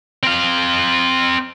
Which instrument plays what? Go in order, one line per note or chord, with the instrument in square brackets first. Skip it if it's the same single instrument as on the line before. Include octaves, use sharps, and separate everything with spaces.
[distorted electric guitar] C4 F5